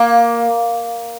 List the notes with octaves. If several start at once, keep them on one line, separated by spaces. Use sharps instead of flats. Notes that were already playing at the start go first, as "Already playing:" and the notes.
Already playing: A#3